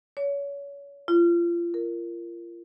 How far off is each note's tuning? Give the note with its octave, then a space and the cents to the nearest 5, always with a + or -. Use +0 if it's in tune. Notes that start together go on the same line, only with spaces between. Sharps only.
C#5 +30
F4 -30
A#4 -10